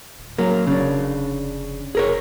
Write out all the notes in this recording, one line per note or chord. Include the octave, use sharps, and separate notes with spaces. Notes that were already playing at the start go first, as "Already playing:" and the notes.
D1
F#3 A#3
F1 C#3 D4
F1 G#4 A#4 C#5